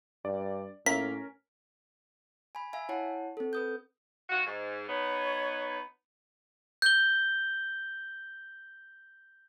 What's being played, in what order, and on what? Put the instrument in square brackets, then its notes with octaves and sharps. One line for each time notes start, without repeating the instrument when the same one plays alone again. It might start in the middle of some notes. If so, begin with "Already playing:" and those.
[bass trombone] G2 [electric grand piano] D5
[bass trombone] A2 [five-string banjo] A#3 F4 E5 [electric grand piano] C#4 A#4 [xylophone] B6
[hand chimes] G#5 B5
E5 F5 G#5
E4 C#5 F#5 A5
C4 A4
B4 D#6 G6
[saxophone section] D#3 F4 F#4
G#2
[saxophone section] B3 D#4 [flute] C#5
[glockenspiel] G6 G7